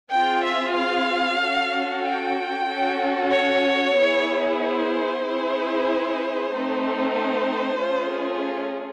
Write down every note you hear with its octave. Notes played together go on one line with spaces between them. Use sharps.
C4 F4 G#4 G5
E5
F5
C#4 F#4 A4
G5
C#4 F#4 A4
C#5
B3 E4 G#4
C5
C4 E4 G#4
A3 C4 D#4
C5
A3 C#4 F4 G#4